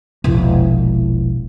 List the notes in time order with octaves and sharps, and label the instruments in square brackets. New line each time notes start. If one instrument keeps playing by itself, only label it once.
[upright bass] E1 A#1